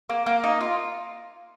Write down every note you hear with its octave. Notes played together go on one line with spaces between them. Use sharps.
A#3
A#3
D#4
F4